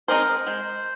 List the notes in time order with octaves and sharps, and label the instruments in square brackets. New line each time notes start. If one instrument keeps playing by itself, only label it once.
[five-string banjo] C4 D#4 G#4 C5 [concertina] A#4
[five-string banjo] G#3 [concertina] C5